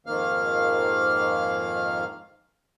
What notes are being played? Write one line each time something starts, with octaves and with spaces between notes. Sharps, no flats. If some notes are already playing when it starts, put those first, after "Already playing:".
F2 G#2 D#3 A#3 F5 F6